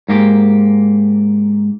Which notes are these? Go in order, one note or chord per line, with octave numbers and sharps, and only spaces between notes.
G#2 A#3 G4